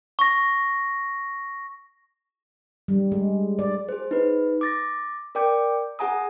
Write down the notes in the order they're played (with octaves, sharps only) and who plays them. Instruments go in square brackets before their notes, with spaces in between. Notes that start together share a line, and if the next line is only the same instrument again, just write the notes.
[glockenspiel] C#6 A#6
[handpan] G3
G#3
D5
[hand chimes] G#4 C5
D#4 B4
D6 A6 A#6
A#4 D5 G5 D6 G6
G#4 F#5 G#5 A#5 D#6